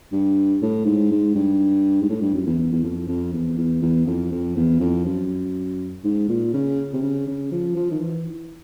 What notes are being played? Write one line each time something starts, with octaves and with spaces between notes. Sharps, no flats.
G2
A2
G#2
G#2
G2
G#2
A2
G2
F#2
E2
E2
E2
F2
F2
E2
E2
E2
F2
F2
E2
F2
F#2
G#2
A#2
C#3
C3
C#3
C#3
F3
F3
D#3
E3